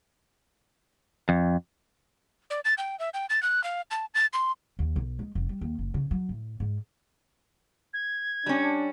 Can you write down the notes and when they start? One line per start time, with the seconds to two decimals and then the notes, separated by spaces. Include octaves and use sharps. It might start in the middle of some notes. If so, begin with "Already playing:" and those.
1.29 F2
2.50 D5
2.65 A6
2.78 G5
2.99 E5
3.14 G5
3.30 A6
3.43 F#6
3.64 F5
3.91 A5
4.14 A6
4.33 C6
4.79 D#2
4.96 B1
5.19 G#3
5.35 F1
5.49 G3
5.61 D#2
5.79 F#1
5.94 C#3
6.11 F#3
6.29 A2
6.60 G#2
7.93 G#6
8.46 G3 C#4 D4